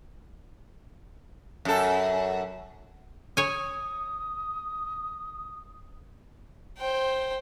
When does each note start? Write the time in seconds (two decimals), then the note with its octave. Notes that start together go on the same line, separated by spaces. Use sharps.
1.65 F#2 A4
3.37 C#5 G#5 D#6
6.78 C5 G5